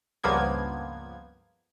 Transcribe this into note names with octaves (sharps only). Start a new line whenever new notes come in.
C#2 G2 F3 A#3 B3 G#6